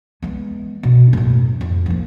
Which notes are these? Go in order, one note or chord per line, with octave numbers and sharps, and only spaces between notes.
G#3 B3
B2
F#2 A2
F2
F3 A#3